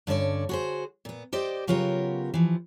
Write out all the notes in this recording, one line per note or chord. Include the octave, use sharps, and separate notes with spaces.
G2 D3 C#4 C#5 D5
F#4 G#4 C5
A#2 B3
G4 C5 D5 D#5
C#3 F#3 B3 F4 G4 A#4
E3 F3